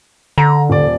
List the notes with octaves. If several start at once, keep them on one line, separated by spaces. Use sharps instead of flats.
D3 A#5
D#1 D5